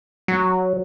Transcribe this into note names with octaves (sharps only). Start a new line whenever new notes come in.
F#3